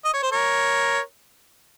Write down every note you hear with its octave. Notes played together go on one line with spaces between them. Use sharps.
D#5
C#5
C5
A#4 C#5